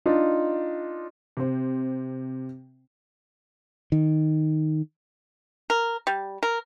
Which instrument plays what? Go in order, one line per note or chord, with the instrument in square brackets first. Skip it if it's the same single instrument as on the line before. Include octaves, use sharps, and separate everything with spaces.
[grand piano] D4 D#4 F4
[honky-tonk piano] C3 C5
[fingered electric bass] D#3
[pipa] A#4
G3
A#4